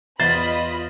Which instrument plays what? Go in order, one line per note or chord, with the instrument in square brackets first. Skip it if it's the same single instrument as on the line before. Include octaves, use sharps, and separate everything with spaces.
[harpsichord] E2 C5 [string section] F4 D#5 B5 [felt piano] A6